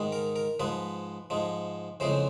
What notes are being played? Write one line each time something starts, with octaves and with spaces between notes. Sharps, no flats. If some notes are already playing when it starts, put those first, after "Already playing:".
Already playing: G#2 D#3 G#3
A#4
A#4
G#2 F3 G#3 B4
G#2 F3 G#3
F2 C#3 E3 G#3 C5